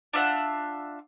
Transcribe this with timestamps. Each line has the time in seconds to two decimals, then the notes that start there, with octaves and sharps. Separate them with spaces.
0.13 D4 F4 E5 F#5